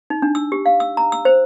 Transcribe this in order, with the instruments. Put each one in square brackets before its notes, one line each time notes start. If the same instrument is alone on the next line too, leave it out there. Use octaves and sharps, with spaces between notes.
[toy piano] D#4
D4
E6
G4
F5
E6
A#5
E6
C5